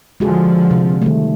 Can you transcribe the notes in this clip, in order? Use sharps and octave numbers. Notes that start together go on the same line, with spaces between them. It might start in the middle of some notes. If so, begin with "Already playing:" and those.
D3 F3 G#3 F#4 G#4
C3
D#3 G3 A3